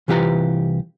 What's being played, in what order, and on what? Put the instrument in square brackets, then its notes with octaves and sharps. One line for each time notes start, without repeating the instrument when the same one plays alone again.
[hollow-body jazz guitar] C2 E3 F4 G4 B4 A#5